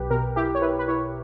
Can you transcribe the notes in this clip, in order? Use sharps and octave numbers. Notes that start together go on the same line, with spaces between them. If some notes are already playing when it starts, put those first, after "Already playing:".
Already playing: B1 B2 G4 B4
B2 A#4
E4 G4
C#5
E4 B4
B4
E4 C#5